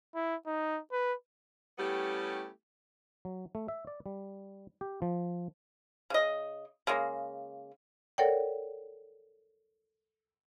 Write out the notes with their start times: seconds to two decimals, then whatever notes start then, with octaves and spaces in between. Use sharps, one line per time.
0.15 E4
0.47 D#4
0.92 B4
1.79 G3 A3 B3 C#4 E4 G4
3.25 F#3
3.55 A3
3.68 E5
3.87 D5
4.06 G3
4.81 G4
5.02 F3
6.10 C#3 D#5
6.87 C#3 G#3 A#3
8.18 A4 A#4 C#5 D5 F#5 G5